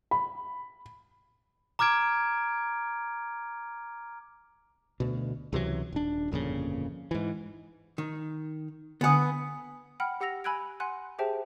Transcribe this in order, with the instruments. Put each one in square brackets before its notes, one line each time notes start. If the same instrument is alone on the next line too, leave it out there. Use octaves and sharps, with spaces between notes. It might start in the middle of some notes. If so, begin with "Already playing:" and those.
[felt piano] B5
[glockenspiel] A#5 D6 F6 G#6 D7
[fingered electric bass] D2 B2
C#2 C3 E3 F#3
D#1 D4
G1 F2 A#2 C#3
G#2 E3
[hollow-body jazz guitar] D#3
[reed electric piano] D3 G#5 D#6 [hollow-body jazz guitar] B3 F#5
[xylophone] F#5 G5 B5 F6
G4 F#5 E6 A#6 F7
G#5 B5 E6 F#6 G#6 D7
F#5 G#5 C6 F#6
G4 G#4 C5 E5 G5 A5